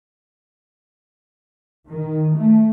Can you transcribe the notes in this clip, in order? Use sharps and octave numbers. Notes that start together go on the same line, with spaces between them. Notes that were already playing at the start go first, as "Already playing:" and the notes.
D#3
A3